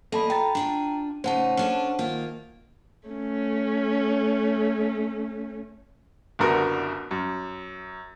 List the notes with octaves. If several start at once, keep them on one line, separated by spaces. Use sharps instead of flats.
E2 A#3 A4 D#5 A5 B5
F4 G5 A#5 A6
D4 F4 G#5
A2 C#3 D#4 C5 F#5 A5
C#4 D4 A4
D#3 A#3 F4
A3 C#4
F#1 C2 D3 B3 F#4 A#4
F#2